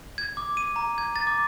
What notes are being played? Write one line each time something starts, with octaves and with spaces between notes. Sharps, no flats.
G#6
D6
D#7
A#5
G#6
A6
D6